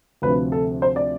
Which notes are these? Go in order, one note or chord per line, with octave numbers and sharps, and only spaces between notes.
D2 C3 F3 B4
A4
C5
D5